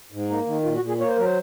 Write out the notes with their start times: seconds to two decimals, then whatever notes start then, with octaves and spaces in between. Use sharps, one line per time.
0.12 G#2
0.29 A#3 D#4
0.46 D#3
0.64 A#2 F4
0.76 F#4
0.82 A#2
0.88 G#4
1.00 A#3 C#5
1.09 C5
1.16 F#3 A#4
1.25 C5